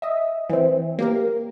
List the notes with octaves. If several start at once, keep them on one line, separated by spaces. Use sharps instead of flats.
D#5 E5
E3 C4
A#3 G4 A#4